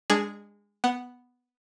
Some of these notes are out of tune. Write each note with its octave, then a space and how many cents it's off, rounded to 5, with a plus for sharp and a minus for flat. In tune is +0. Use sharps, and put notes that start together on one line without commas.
G#3 -20 D4 +0 G#4 +0
B3 +0 F#5 +0